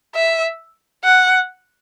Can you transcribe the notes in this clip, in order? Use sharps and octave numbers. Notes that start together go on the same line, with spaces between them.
E5
F#5